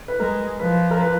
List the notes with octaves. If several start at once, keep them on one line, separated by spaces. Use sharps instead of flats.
B4
G#3 A#4
F3 B4
A#4
B4